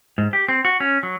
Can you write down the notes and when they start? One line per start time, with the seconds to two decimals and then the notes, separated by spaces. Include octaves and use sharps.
0.18 G#2
0.33 G4
0.49 C4
0.65 F#4
0.80 C#4
1.03 F#3